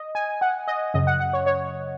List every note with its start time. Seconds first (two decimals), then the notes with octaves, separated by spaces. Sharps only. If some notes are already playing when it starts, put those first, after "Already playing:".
Already playing: D#5
0.15 G#5
0.41 F#5
0.67 D#5
0.94 F#2 C#3 D#5
1.07 F#5
1.20 F#5
1.33 C#5
1.46 C#5